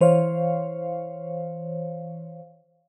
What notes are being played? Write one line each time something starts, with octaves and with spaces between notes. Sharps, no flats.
E3 C5 C#5 F5